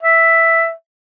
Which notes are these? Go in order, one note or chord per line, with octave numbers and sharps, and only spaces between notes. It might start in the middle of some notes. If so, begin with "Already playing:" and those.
E5